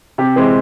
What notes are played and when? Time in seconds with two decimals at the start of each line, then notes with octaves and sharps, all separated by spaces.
0.18 C3 G4
0.36 E3 G#3 C4 E4